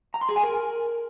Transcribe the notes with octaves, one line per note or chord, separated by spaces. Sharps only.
A#5
C6
G#4
G#5
A#4